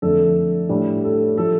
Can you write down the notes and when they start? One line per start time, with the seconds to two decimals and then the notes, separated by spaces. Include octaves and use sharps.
0.02 F2 D3 A3 D4 A4
0.69 A2 G3 D4
1.04 A4
1.37 F3 A3 A4